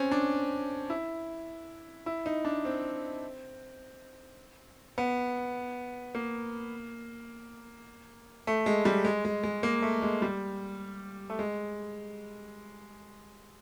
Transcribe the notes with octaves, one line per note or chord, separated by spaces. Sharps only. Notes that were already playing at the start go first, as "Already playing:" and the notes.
Already playing: C4 C#4
D4
E4
E4
D#4
D4
C4
B3
A#3
A3
G#3
G3
G#3
G#3
G#3
A#3
A3
G#3
G3
A3
G#3